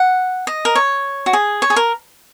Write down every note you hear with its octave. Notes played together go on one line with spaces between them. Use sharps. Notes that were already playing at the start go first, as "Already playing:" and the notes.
Already playing: F#5
D#5
A#4
C#5
F#4
G#4
C#5
G#4
A#4